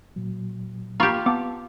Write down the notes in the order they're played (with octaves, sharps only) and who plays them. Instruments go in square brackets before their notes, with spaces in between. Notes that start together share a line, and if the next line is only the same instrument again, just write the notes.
[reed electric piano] A#2 F#3
[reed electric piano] A#3 [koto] F4 G4 [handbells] A#5 B5 C#6
[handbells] B3 D6 [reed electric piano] F5 A5